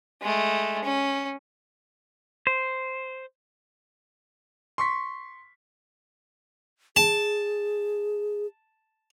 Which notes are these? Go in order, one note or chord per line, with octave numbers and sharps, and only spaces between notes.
G#3 A3
C#4
C5
C6 C#6 B6
G#4 A5